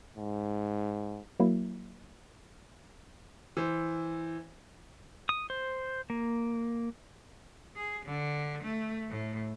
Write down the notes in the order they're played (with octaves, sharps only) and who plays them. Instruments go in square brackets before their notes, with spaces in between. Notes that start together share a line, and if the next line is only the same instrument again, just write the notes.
[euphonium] G#2
[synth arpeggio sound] F#3 A#3 E4
[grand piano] E3 C5
[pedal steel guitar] D#6
C5
A#3
[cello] G#4
D3
A3
A2